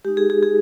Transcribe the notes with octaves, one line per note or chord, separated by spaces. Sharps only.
G#3 D#4 G4
G#4
G#4
G#4